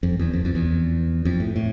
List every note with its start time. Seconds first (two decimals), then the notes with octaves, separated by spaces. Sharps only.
0.03 F2
0.19 E2
0.33 F2
0.45 F2
0.55 E2
1.25 F2
1.40 A2
1.56 A2